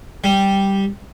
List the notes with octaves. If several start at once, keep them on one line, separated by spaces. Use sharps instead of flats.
G3